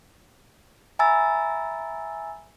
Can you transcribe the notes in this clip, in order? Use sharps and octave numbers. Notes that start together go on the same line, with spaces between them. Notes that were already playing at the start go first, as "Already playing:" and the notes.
E5 G#5 A#5 B5 E6 A6